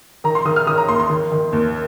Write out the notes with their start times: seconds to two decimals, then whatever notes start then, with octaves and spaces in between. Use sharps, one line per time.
0.24 D#3 A#5
0.35 C6
0.45 D#3 D#6
0.56 F6
0.67 D#3 D#6
0.78 A#5
0.88 D#2 C6
1.00 C6
1.09 D#3
1.32 D#3
1.53 D#2